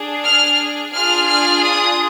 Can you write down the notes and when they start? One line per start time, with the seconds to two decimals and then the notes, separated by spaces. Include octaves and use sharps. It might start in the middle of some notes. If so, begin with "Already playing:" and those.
Already playing: D4 G#4
0.24 F6
0.93 D4 F4 G#4 F6
1.28 F6
1.62 D#6